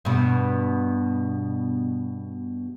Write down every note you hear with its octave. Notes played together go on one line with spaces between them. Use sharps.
G2 B2